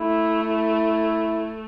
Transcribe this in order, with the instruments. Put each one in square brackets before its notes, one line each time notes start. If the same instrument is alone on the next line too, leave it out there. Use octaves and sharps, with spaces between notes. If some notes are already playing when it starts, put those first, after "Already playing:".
Already playing: [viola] A3 [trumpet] E4
[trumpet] E4